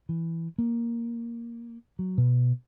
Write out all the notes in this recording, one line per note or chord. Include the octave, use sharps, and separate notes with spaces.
E3
A#3
F#3
B2